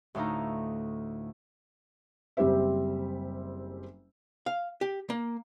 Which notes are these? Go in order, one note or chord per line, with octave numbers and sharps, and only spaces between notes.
D2 A2 D4 D#4 F5 A#5
F#1 G3 C4 G4 C5 E5
F5
G4
A#3